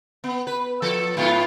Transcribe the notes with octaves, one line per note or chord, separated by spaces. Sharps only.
B3
B4
F3 A4
G#2 B3 F4